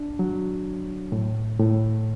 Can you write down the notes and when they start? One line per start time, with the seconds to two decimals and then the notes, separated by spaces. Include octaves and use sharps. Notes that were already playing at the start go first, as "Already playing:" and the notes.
Already playing: D4
0.19 F#3
1.12 A2
1.59 A2